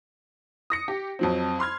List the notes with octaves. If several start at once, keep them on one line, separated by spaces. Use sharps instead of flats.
D#6 A#6 C#7
G4
F2 F#3 C4
B5 C6 F6 G#6